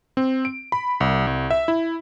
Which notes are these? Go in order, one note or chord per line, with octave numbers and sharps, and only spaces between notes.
C4
D7
B5
C2
C2
E5
E4